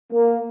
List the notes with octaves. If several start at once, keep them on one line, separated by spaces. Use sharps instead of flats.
A#3